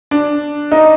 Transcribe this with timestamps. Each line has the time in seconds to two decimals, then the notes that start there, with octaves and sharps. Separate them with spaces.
0.11 D4
0.72 D#4